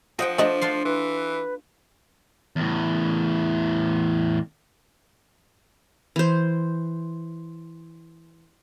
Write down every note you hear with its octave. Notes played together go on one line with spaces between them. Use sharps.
F3 C5 D#5 F#5 G5
A3 D4 C5 D5 D#5
D4 F4 C6
E3 B4
E2 A2
E3 C5